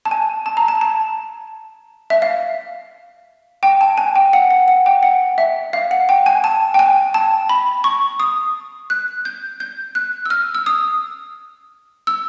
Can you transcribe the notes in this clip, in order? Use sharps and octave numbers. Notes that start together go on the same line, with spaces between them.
A5
G#5
A5
A#5
A5
A5
E5
F5
G5
A5
G#5
G5
F#5
F#5
F#5
G5
F#5
E5
F5
F#5
G5
G#5
A5
G5
G#5
A5
B5
C#6
D#6
F#6
G6
G6
F#6
E6
F6
E6
D#6
E6